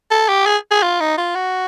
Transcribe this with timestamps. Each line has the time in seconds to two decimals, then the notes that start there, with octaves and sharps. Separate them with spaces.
0.11 A4
0.28 G4
0.46 G#4
0.71 G#4
0.82 F4
1.00 D#4
1.18 F4
1.35 F#4